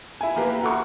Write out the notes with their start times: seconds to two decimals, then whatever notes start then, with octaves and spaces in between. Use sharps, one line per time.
0.21 E4 G#5
0.36 A#3 G4 B4
0.62 F#4 A4 C6 C#6